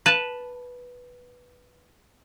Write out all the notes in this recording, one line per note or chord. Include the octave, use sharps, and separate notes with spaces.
B4 A5